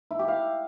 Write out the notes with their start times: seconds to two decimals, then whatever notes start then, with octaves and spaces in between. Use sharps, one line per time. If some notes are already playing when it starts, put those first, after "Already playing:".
0.11 E4
0.19 G4
0.28 F5